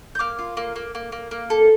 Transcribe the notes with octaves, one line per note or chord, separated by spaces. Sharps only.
G6
A#3 D6 F6
F4
A#3
A#3
A#3
A#3
A#3
A4